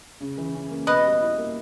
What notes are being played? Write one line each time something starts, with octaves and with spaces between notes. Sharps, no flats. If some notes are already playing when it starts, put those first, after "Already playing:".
C#3
E3
C#4
A#3
B2 B4 D#5
G3
E4
A#3